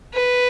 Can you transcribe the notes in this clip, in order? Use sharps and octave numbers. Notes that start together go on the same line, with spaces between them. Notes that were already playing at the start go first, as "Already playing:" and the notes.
B4